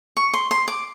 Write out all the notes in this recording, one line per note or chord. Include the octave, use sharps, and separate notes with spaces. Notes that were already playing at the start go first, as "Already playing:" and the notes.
C#6
C6
C6
D6